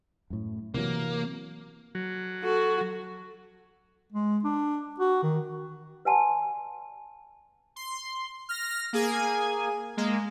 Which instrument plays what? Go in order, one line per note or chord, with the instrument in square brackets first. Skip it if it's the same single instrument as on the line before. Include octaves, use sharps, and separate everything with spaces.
[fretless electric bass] F#2 A2
[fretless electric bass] C3 E3 F#3 [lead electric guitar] A#3
[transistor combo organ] F#3
[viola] F#4 A4
[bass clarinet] G#3
D4
F#4
D#3
[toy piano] B4 D5 F#5 G#5 A5 C6
[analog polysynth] C6
F6 A#6
A#3 G#4 G#5
G#3 A#3